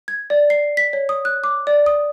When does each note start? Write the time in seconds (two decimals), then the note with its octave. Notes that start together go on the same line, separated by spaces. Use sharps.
0.08 G#6
0.30 D5
0.50 C7
0.77 B6
0.93 C#5
1.09 D#6
1.25 F#6
1.44 D6
1.67 D5
1.86 D#6